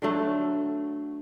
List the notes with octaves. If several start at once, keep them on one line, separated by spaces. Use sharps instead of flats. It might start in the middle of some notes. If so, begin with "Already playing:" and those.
D3 F#3 A3